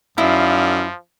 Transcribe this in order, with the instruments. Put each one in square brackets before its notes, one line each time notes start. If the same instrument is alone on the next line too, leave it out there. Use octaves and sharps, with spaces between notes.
[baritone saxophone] F#2 [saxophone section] D#3 D5 F5 [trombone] F3 [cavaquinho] E4 D#5